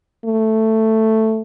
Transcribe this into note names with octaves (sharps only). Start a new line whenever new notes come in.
A3